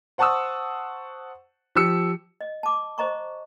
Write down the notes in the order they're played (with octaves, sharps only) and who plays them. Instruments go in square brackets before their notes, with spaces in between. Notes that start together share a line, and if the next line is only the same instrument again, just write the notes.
[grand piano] C5 F#5 A5 C#6 D#6 E6
F3 G4 E6 C#7
[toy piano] D#5
A5 D6
C5 D#5 A#5 C#6